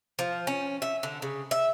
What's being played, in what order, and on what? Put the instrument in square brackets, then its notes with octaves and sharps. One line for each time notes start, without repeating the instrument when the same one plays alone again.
[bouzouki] F3
C#4
E5
D3
C#3
E5